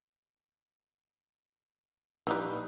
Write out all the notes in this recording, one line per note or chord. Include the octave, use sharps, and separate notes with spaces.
A#1 E3 G3 D#4 B4